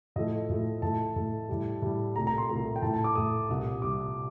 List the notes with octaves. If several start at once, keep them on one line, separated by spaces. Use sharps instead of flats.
A2 F3 A3 D#5
A2 F3 A3
A2 A3 A5
A2 A3
A2 G3
A2 G3
C2 A#2 A3 A#5
A#5
C6
C2 A#2 A3 A#5
G5
A2 A3 A5
A5
D6
A2 A3 D#6
C2 A#2 G3
C2 A#2 G3 D6